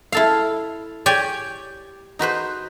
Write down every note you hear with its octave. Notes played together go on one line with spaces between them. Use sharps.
E4 A4 F5
G4 C#5 D5 G5 G#5
D#4 F#4 B4 C5